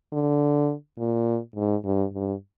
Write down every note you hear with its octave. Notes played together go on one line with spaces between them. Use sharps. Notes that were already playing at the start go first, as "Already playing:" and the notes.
D3
A#2
G#2
G2
G2